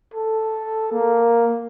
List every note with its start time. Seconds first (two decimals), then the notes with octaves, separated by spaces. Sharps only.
0.14 A4
0.92 A#3